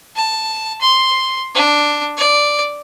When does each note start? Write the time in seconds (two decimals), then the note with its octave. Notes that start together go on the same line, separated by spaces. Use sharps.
0.16 A5
0.81 C6
1.55 D4
2.17 D5